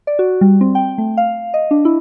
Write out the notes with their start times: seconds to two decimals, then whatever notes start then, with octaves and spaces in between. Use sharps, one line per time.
0.07 D5
0.19 F#4
0.41 G3
0.61 C4
0.75 G5
0.98 A3
1.17 F5
1.54 D#5
1.71 D4
1.85 E4